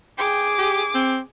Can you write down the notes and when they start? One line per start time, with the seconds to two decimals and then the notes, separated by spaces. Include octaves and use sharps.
0.18 G#4 G5 D6
0.58 G4
0.95 C4